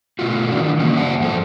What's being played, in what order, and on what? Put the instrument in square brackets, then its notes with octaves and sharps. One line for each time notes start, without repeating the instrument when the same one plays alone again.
[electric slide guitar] B2 A3 F4 F#4
D#3 E3 D4
C#3 F#3 A#3 C#4
D5 E5 F#5 A5
G2 F3 G4 A4